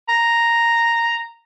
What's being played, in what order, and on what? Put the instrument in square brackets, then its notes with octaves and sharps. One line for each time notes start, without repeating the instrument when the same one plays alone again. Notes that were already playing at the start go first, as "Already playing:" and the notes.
[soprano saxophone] A#5